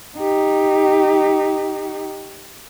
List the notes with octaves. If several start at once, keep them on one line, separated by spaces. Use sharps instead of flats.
D#4 G4